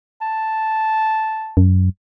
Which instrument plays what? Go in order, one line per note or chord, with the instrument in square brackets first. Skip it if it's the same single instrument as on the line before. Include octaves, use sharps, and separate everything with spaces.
[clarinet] A5
[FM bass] F#2